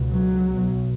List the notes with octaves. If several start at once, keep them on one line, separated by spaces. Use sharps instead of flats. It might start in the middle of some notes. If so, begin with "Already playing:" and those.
Already playing: C#2 B2
F#3
B1 B2